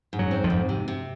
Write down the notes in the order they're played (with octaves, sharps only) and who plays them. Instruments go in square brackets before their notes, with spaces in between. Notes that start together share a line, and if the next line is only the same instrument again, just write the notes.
[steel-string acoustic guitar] G#2
[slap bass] F#2 F#3
[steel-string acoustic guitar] C4
[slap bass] F2 F3
[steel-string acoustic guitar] G#2
C3
C3